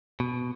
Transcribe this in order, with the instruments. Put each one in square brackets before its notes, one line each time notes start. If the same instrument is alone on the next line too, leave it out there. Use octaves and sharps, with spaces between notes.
[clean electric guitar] B2